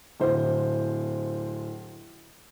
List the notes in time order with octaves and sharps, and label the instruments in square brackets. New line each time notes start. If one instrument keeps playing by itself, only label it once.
[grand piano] D1 C5